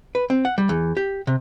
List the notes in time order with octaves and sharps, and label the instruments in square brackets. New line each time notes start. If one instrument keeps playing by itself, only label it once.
[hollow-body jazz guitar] B4
C4
F#5
G3
E2
G4
C3